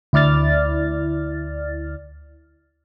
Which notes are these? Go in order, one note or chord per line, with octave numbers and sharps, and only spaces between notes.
D2 E4 D5 F6 A6